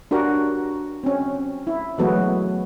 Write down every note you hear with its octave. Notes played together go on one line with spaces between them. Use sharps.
D4 F#4 G4 A#4
C4 C#4
E4
E3 F#3 G#3 A3 B3 F#4